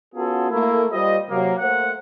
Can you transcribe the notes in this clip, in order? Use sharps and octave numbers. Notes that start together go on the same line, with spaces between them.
B3 C#4 F4 F#4 G#4 A4
A3 A#3 E4
G3 F4 G4 C5 D#5
C3 F#3 A#3
A3 A#3 A#4 C5 F#5